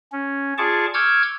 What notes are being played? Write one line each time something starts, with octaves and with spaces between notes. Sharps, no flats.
C#4
F4 G#4 D5 A5 C#6 D6
C#6 D6 E6 F6 G6 G#6